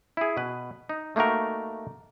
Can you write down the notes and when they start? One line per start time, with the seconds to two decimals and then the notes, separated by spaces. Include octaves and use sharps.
0.17 E4 G#4
0.37 B2 B4
0.89 D#4
1.16 A3 A#3 D#4 F#4 A#4